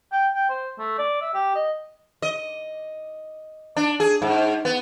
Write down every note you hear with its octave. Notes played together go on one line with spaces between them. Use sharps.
G5
G5
C5
A3
D5
E5
G4
D#5
D#5
D4
G#4
G#2
B3